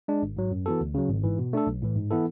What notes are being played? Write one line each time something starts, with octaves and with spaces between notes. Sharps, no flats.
G#3 D4
G#1
G#2 F#3
F#2
E3 B3 F#4 A4
D2
C#3 F#3
G#1
G#2 E3
B2
A3 D4 A4
B1
A2 E3
G#2
E3 B3 E4 A4